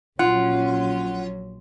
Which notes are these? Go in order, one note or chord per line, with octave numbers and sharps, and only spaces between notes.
A#1 F#3 C#4 F4 F#5